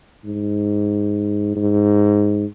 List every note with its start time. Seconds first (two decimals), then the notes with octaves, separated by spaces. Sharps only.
0.25 G#2
1.56 G#2